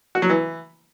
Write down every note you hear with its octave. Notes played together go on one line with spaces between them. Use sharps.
F#4
F#3
E3